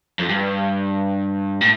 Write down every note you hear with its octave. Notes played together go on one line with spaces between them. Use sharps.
F2
G2
A2